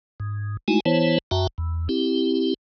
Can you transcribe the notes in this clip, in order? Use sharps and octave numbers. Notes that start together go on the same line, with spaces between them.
G#2
G#3 A3 D#4 E4 F#4 G#5
E3 B3 E4 C5 C#5 A5
F#2 F#4 E5 G5 A5 A#5
E2
C4 E4 G4